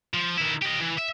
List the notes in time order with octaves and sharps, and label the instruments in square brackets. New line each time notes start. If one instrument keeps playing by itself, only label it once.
[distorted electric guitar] F3
D#3 E4
G4 D#5
E3
E5